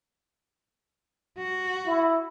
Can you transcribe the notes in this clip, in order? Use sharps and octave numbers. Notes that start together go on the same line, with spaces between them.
F#4
E4